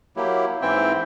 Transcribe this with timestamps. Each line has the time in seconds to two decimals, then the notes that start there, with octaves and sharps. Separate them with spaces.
0.17 F#3 A#3 E4 G4
0.62 G#2 E3 C4 E4 E5 G5